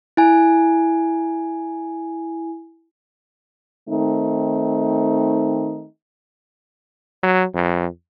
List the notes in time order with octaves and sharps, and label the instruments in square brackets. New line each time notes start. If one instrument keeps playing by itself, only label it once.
[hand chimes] E4 G#5
[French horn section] D#3 A3 C4 D#4
[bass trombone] F#3
F2